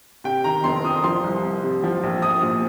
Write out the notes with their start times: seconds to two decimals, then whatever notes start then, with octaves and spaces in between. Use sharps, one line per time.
0.24 C3 G5
0.44 D#3 A#5
0.64 F1 C6
0.85 F2 D#6
1.04 F3 C6
1.23 C2
1.43 C2
1.63 C3
1.84 F3
2.03 A#1
2.22 A#1 D#6
2.43 A#2